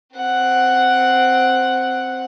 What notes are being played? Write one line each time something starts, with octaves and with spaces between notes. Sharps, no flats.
C4 F#5